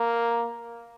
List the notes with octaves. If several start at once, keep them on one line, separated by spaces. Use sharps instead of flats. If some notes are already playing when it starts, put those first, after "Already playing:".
Already playing: A#3